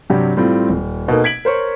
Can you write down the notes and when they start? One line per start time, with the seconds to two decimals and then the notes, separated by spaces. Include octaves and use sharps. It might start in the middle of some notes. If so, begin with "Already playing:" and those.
0.10 G2 C3 F#3 G3 G4
0.37 A2 G3 C4 F4
0.70 D#1
1.08 B2 A3 A#3 D#4
1.24 G#6 B6 D7 F#7
1.45 A#4 C5 C#5 C#6